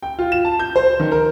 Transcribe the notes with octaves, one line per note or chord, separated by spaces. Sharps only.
G5
F4
E7
A5
G6
C5
D#3
A#4